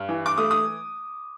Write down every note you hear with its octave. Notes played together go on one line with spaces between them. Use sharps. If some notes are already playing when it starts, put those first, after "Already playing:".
Already playing: G2
E3
D6
A3 D#6
D#6